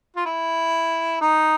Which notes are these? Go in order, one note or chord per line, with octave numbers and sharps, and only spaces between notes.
F4
E4
D#4